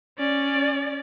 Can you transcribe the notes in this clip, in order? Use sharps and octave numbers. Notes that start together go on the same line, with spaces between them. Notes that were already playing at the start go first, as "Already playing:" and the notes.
C#4 D5